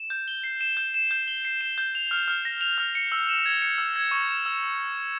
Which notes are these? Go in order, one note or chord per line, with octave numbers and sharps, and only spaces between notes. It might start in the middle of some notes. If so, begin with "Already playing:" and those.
Already playing: E7
G6
G7
C7
E7
G6
E7
G6
G7
C7
E7
G6
F7
F6
F6
A#6
F7
F6
C#7
E6
E7
G#6
C#7
E6
G#6
C#6
E7
E6